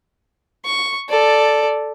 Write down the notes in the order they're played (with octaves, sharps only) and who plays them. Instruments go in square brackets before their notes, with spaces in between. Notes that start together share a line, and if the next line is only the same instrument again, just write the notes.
[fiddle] C#6
A4 D5